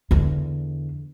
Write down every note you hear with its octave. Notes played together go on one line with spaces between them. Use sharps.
E2 D3